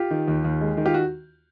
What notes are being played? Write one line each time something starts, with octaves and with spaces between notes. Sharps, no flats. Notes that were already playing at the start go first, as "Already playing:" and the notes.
Already playing: F4 G4
D#3
D#2
D#2
G#3
D#3
F4 G4
F#4